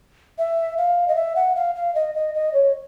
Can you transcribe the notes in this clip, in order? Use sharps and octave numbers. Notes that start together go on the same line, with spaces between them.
E5
F5
D#5
E5
F#5
F5
F5
D#5
D#5
D#5
C#5